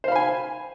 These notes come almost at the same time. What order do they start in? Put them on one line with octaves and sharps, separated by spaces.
C5 F5 B5 G#5